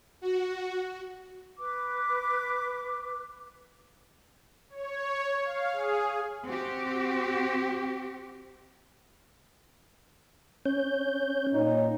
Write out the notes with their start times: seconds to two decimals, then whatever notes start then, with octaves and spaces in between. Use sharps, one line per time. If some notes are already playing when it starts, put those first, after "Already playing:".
0.21 F#4
1.58 B4 D6
4.70 C#5
5.43 F5
5.73 G#4
6.44 C4 F#4 G4
10.66 C#4 C#5 G6
11.53 A#2 D#4 C#5